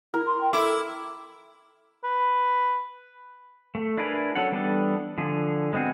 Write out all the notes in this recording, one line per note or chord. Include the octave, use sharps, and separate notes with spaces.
E4 A#4
C6
G5
E4 A4 D6
B4
A3
D4 E4 G#4 A#4 B4
F#3 C#4 A4 F#5
E3 G3 B3 D4 A4
D3 F3 G#4
G#3 B3 C4 F#4 G#4